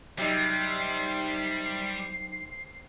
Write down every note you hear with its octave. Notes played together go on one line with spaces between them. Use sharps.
C3 F#3 G3 D#4 C7